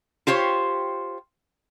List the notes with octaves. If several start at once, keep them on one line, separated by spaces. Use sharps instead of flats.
F4 G4 C5 C#5